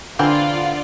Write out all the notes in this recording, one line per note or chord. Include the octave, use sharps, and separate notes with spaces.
D3 E3 A#3 C4 F4 D5